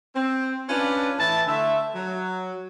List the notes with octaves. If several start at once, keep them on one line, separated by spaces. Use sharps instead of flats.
C4
C#4 D4 F4 B4
A2 E3 E5 A5
D3 A3 E5
F#3